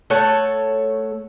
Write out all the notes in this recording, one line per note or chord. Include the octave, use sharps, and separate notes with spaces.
A3 A4 C#5 F#5